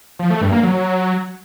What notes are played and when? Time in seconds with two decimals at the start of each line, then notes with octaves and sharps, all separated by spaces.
0.19 F3
0.30 A3
0.41 G2
0.52 A#3
0.63 F#3